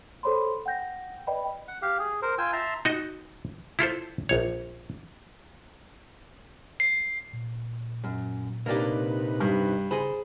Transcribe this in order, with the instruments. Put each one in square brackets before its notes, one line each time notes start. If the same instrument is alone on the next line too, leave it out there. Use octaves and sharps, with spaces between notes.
[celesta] A4 C5 C#5 B5 C6
F#5 G5 G6 A#6
B4 D5 D#5 G5 B5
[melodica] F#5
G4 F5
G#4
A#4 C5
F4 G5 G#5 E6
E5 A5 A#5 C6
[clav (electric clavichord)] D#4 F#4 D#5
E4 F4 A4 C5
A#1 C#5
[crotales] C7
[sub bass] A#2
[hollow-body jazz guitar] F#2
[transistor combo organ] C3 D#4 B4 [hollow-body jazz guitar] A#3 D4 G4
[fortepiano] G2
[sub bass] C#3 [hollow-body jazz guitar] G#4 C5 [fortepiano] B5